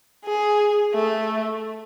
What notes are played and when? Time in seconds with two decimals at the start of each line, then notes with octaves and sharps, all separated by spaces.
0.25 G#4
0.93 A3